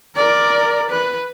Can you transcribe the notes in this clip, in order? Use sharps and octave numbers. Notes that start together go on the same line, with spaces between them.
A#4 D5
B4